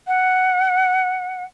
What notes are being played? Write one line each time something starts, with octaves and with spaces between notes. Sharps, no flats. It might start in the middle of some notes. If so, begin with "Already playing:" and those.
F#5